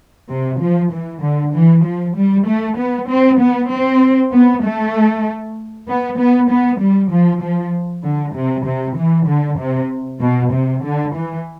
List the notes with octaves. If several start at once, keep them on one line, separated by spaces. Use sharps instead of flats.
C3
F3
E3
D3
E3
F3
G3
A3
B3
C4
B3
C4
B3
A3
B3
B3
B3
G3
F3
F3
D3
C3
C3
E3
D3
C3
B2
C3
D3
E3